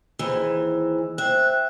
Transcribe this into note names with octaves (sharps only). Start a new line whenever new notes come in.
D#2 E3 G#4 C5 E6
C5 E5 G5 F#6